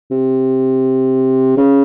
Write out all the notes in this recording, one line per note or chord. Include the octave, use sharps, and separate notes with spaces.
C3
C#3